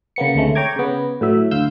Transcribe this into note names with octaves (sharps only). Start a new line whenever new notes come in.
C#3 A#3 B3 C#7
D2 C3 G#3 A3
C#5 G5 A#5 D6 G#6
C#3 B3
A2 F#3 E5
D2 F5 E6 G6